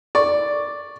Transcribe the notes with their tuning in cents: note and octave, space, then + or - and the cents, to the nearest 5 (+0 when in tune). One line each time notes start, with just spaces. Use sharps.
D5 +0 C#6 +0